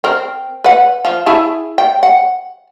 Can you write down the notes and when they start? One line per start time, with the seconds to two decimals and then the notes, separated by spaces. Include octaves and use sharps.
0.04 C4 A#4
0.64 B4 F#5
1.05 F3
1.26 E4 G#4 A5
1.78 G5
2.03 F#5